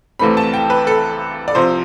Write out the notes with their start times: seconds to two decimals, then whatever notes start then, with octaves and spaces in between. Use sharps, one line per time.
0.19 C2 C3 E3 A3 C4 B5
0.37 A5
0.53 G5
0.70 B4
0.87 A4
1.48 D5
1.55 C2 C3 F3 C5